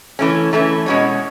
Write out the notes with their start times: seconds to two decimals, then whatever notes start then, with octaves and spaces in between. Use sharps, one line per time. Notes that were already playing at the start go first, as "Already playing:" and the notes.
0.19 E3 A3 C#4
0.53 E3 A3 C#4
0.86 B2 G#3 C#4 F#4 C#5